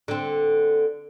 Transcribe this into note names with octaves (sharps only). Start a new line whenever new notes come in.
D3 C4